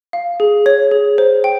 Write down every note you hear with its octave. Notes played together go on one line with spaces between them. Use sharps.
F5
G#4
C#5
G#4
C5
G5